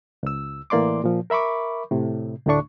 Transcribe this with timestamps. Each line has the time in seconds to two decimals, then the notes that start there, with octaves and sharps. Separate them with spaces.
0.23 C#2 E6
0.70 A2 E3 A#3 D5 C6 D6
1.04 A#2 F3
1.30 A#4 E5 B5 C#6 D6
1.91 A2 C3
2.46 D2 A2 D3 A3 D4 C#6